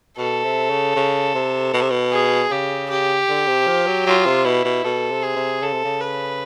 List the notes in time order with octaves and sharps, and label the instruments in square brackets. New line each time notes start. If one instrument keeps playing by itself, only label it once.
[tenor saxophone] B2 [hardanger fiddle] A4
[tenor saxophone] C3
C#3
C#3
C3
B2
C3
B2
[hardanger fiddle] G#4
[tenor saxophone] C#3 [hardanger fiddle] G4
[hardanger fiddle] G4
[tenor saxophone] D3
C3
F3
F#3
[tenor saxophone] F#3 [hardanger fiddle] F4
[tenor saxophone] C3
[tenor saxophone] B2 [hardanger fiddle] E4
[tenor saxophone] B2
[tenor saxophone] B2 [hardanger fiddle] A4
[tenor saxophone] C3
[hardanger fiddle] G#4
[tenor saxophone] C3
[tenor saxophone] C#3 [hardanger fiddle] A4
[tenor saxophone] C3
C#3
[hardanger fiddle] B4